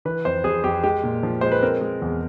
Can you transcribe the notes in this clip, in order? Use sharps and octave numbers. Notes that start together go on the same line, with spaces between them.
E3 B4
F2 C5
F2 G#4
F2 G4
G#3 G4
A#2
F3
G#3 C5
B4
C4 A#4
G#3
E2